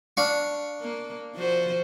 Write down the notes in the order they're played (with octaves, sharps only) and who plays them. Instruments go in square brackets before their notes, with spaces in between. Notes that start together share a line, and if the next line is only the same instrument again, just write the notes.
[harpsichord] D4 F5 C#6
[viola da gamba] A#3
F3 F#4 C5